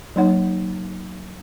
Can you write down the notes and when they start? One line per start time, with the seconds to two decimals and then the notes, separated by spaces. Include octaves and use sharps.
0.16 F#3 A#3 D#4 C#5 F#5